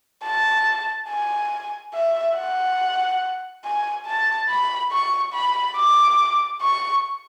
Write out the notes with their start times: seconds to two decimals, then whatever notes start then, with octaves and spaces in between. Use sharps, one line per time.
0.24 A5
1.09 G#5
1.95 E5
2.37 F#5
3.65 G#5
4.06 A5
4.49 B5
4.92 C#6
5.34 B5
5.77 D6
6.62 C#6